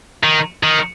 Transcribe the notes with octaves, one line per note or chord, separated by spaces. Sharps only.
D#3
D#3